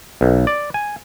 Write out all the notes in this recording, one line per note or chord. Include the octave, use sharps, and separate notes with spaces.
B1
D5
G#5